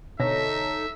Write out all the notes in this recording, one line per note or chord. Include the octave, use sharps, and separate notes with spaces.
B2 D3 D#4 A4 C#5 E5 A#6